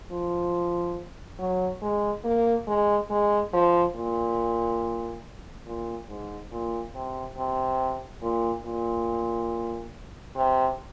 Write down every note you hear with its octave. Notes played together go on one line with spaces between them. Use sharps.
F3
F#3
G#3
A#3
G#3
G#3
F3
A#2
A#2
G#2
A#2
C3
C3
A#2
A#2
C3